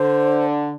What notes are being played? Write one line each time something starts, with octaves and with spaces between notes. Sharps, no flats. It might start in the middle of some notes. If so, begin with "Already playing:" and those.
Already playing: D3 C5